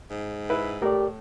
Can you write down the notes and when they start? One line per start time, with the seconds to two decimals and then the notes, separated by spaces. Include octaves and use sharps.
0.10 G#2
0.50 E4 B4
0.82 A2 G4 A#4 D5